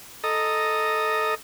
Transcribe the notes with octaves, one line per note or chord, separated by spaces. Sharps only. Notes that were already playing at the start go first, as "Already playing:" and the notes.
A4 D#5 A#5